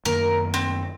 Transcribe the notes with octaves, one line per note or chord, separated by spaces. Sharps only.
F#2 D#3 A#3 A#4
C4